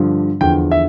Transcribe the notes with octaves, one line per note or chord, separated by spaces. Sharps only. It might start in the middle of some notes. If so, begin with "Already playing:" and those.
Already playing: G2 D3 F3
E2 D3 F3 G5
E5